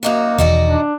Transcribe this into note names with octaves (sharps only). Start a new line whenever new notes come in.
F#2 A#3 D#4 F#4
E1 E2 D#3 D#4 F#4 D5
D4